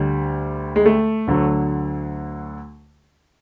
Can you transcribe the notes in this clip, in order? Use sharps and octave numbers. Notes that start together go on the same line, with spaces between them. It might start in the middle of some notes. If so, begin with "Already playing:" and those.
Already playing: D2 D3 G3
G#3
A3
D2 D3 F#3